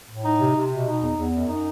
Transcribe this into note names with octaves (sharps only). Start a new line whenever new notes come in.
A2
D#4
C3
C3
B2
D#4
E2
E2
F#2
D#4